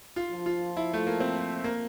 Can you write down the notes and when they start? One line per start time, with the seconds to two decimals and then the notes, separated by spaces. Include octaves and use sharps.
0.16 F4
0.32 F3
0.46 F4
0.77 E4
0.93 A3
1.07 A#3
1.20 C4
1.64 A#3